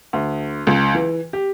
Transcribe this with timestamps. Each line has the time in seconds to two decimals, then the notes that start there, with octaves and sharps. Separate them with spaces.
0.13 D2
0.67 C#2
0.95 E3
1.33 G4